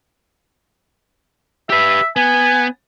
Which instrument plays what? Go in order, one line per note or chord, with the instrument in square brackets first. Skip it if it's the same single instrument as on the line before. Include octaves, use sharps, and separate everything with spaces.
[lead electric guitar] G4 B4 [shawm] E5
[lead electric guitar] B3 [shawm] G#5